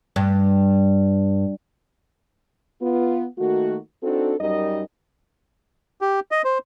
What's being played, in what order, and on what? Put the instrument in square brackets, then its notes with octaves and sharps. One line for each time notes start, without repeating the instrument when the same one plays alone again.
[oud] G2
[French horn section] B3 F4
D#3 A3 A#3 F#4
C4 D4 D#4 F#4 A4
F#2 G3 D#4 A#4 D#5
[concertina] G4
D#5
C5